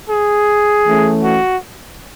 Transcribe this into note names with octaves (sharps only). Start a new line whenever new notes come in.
G#4
E3 A3 C#4
F#4